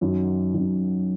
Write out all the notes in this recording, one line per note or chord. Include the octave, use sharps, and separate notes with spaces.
F#2 D#3 F#3
F#2 D#3 F#3